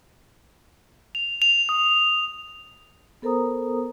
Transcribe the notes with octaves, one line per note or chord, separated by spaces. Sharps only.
F7
F7
D#6
B3 A4 A#4 C5 A#5 D#6